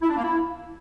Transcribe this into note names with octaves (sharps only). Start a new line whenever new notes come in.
E4
D4
A#3
E4